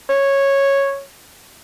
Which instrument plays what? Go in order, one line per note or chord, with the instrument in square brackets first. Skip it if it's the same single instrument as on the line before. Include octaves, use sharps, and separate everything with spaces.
[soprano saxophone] C#5